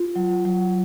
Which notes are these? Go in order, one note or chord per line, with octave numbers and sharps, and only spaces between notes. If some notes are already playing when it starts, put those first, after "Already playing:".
Already playing: F4
F#3
F#3